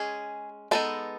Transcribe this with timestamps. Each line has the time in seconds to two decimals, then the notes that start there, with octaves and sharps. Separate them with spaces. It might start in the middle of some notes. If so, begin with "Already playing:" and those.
Already playing: G#3 C#4 G#4
0.71 G#3 B3 D#4 A4